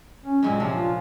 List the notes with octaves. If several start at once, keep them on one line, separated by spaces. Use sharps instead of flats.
C#4
F#2 A#2 G#3 C4
C3 F3 C#4 D4
F4